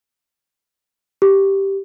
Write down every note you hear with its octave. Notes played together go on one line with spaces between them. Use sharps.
G4